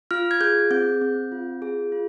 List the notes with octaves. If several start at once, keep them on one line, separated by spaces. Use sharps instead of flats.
F4 F6
G#6
G#4 G6
C4 G6
C4
F4
G#4
F4